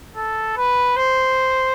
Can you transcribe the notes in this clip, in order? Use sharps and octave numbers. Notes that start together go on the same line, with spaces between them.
A4
B4
C5